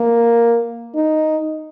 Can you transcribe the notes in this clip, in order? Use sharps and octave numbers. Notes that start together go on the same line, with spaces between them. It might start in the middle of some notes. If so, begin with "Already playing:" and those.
Already playing: A#3
D#4